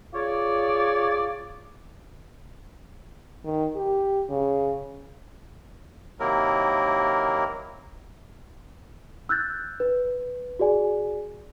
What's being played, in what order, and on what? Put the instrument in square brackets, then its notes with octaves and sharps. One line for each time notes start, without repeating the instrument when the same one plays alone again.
[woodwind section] F4 G#4 C#5 D5
[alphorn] D#3
G4
C#3
[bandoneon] C3 D#3 F#3 A#3 E4 A#4
[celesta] E6 F#6 G6 A6
B4
F#4 G#4 D5 G#5